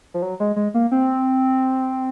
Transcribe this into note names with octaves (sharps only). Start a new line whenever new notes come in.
F3
F#3
G#3
G#3
A#3
C4